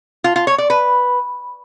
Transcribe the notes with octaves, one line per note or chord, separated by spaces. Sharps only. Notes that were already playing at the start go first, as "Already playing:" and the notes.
F4
F4
C#5
D5
B4